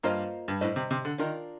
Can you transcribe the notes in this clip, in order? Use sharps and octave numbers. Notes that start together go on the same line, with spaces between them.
G2 A#3 F4 C5 D#5
G2
A2 G3 D4 F4 C5 D#5
C3
C3
D3
D#3 D4 F4 A#4